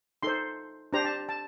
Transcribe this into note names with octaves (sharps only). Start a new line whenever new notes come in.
D#4 A4 C5 C6
D4 G4 C5 A#5
A5
A5